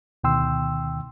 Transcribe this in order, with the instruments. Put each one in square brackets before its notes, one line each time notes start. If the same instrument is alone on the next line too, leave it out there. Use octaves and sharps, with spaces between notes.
[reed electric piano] D2 B2 D#3 G5 C6 E6